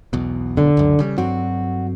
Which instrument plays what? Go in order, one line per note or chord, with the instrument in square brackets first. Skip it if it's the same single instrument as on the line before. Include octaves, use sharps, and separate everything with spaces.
[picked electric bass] B1 E2 B2
[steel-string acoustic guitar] D3
[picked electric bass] C#2 F#2
C#3 G3
[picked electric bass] G2 F#3 C4 [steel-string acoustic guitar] F#4